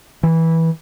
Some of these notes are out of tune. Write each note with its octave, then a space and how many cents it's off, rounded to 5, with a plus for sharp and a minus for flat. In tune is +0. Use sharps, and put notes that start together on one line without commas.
E3 -15